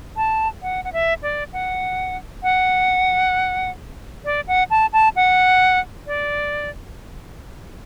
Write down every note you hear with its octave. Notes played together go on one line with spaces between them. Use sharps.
A5
F#5
F#5
E5
D5
F#5
F#5
D5
F#5
A5
A5
F#5
D5